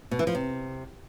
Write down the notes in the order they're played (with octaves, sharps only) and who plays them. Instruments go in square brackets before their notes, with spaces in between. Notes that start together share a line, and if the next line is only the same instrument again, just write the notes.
[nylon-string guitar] B2
E3
F3
C3